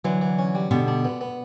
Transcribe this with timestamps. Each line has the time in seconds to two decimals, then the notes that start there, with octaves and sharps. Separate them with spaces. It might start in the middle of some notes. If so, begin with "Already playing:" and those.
0.05 D3 E3 F#3
0.21 E3
0.39 C#4
0.55 G3
0.71 B2 D3 G4
0.88 D4
1.05 B3
1.21 B3